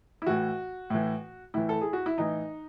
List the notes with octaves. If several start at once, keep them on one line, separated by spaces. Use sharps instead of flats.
E4
A2 E3 F#4
A2 E3
A2 E3 E4
A4
G#4
F#4
E4
A2 E3 D#4